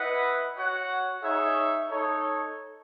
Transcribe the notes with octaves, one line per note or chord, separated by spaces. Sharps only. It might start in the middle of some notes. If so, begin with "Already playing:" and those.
Already playing: E4 B4 D#5 F#5
F#4 C#5 F#5
D#4 G#4 C#5 E5
D#4 A4 C#5